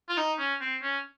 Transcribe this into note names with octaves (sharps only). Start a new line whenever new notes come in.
F4
D#4
C#4
C4
C#4